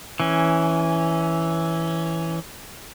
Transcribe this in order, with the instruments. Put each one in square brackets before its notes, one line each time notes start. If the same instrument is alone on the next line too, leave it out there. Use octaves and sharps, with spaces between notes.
[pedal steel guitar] E3 C#4